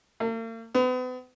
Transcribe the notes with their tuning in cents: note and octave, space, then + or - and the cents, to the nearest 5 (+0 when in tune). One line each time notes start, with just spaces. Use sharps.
A#3 -45
B3 +40